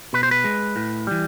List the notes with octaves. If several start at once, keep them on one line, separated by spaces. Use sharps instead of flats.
B2 B4
C5
B4
G#3
A2
E3 G3